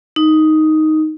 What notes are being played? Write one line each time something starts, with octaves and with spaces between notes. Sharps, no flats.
D#4